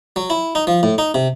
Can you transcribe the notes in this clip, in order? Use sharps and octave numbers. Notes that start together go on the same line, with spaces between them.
F#3
E4
D#4
F3
A2
D#4
C3